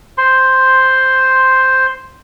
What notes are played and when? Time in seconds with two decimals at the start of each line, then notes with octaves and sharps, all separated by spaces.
0.18 C5 C6